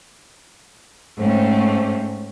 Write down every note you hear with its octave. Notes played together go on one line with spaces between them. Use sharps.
G#2 A3 C4 C#4